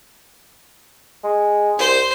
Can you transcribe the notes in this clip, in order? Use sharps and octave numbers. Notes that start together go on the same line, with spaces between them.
G#3
C2 C5